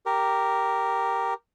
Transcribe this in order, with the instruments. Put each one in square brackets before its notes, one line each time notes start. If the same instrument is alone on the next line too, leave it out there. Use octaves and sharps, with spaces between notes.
[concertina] G4 A#4